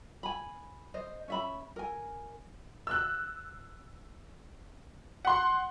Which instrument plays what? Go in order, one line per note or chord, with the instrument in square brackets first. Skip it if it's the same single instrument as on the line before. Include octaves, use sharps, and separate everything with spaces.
[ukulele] G#5 B5
C5 D#5
C#4 E5 B5
A#4 G#5
[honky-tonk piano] E6 F#6
F#5 C6